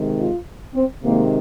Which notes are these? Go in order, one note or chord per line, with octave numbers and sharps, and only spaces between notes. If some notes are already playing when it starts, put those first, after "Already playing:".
Already playing: C3 D#3 G#3
F4
C4
C3 D#3 G#3 A#3